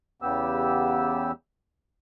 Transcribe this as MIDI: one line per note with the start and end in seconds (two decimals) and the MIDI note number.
0.22 1.32 40
0.22 1.32 49
0.22 1.32 59
0.22 1.32 67
0.22 1.32 88